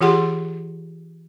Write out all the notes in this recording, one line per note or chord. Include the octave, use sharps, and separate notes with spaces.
E3 F4 G4 G#4 F#5 C6